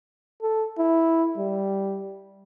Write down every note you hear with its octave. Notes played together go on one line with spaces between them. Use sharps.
A4
E4
G3